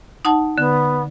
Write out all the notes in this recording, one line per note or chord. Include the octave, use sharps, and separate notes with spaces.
D#4 F#5 A5
D3 B3